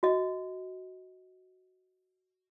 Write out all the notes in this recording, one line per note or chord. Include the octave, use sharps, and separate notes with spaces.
F#4 D#5